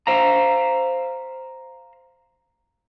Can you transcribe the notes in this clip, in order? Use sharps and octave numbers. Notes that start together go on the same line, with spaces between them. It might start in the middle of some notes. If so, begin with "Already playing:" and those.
C5 F5 A#5